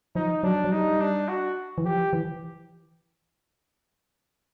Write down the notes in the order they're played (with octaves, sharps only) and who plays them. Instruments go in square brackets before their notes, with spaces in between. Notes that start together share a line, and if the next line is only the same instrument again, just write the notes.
[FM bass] F3 [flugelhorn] D#4
[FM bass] F#3 [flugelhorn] D4
[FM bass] F#3
[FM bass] G3 [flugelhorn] D#4
[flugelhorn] D4
F#4
[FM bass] E3
[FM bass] F3 [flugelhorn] G4
[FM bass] E3